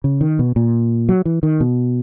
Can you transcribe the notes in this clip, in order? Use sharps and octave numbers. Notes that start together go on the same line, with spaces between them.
C#3
D#3
B2
A#2
F#3
E3
D#3
B2